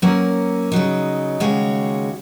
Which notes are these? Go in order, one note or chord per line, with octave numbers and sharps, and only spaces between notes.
F#3 A#3 C#4 A#4 C#5
C#3 F#3 D#4
D#2 C#3 G#3 F#4 C#5